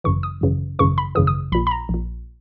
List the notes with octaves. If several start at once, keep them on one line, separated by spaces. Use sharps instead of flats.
G#1 F#2 C#3 E3 C#6
D#6
G#1 F#2 C#3 E3
G#1 F#2 C#3 E3 C#6
B5
G#1 F#2 C#3 E3 D#6
D#6
A#1 A#2 B5
B5
A#5
A#1 A#2